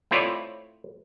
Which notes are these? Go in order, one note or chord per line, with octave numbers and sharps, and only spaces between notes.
A3 C4 E4 F4 C#5 D5